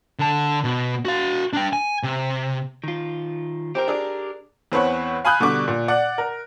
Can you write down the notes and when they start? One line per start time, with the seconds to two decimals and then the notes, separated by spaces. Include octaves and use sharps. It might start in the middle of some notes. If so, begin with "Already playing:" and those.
0.19 D3 A5
0.64 B2
1.05 F#4 F5
1.53 D4 G5
1.73 G#5
2.03 C3
2.84 D#3 F4
3.75 C4 G4 A#4 C5
3.88 D4 G#4
4.72 E2 C4 B4 C#5 F#5
5.25 F5 G#5 B5 D#6 F#6 G6
5.40 B2 D3 G3 C#6 D6
5.68 A#2
5.88 D5 F#5
6.18 A#4